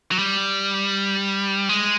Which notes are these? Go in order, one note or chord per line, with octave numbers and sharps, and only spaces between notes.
F#3
G3
G#3